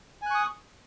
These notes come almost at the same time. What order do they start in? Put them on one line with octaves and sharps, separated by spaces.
G#5 F#6 C#6 D#6